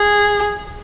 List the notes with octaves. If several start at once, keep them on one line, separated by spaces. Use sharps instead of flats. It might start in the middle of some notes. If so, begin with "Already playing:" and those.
Already playing: G#4